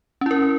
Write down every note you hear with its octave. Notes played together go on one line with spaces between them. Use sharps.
C#4 E4 A#4